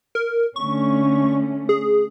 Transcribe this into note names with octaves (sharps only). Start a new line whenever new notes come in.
A#4
D3 A3 C#4 C#6
G#4